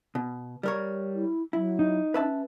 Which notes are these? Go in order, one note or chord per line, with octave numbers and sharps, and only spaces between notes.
B2
G3 A#4 C#5
E4
F#3 E4
D#4
C#4 B4 E5 A5